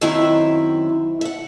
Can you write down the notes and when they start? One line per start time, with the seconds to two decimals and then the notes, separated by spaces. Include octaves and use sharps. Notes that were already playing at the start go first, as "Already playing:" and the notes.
0.01 F#2 D#3 F#3 C4 E4 E5
1.21 E5
1.25 F#5